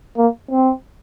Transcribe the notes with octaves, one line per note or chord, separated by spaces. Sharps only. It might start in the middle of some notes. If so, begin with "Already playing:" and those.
A#3
C4